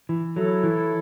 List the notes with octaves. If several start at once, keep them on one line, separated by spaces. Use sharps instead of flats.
E3
F#3 A3 E4 A4 C#5
E3